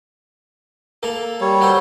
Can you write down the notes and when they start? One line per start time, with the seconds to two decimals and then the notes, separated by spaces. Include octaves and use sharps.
1.03 A#3 A4
1.41 G3 C#5
1.61 F#3 A4 C5